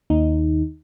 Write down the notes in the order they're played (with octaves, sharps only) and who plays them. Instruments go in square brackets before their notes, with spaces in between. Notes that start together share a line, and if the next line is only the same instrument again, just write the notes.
[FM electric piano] D#2 D#4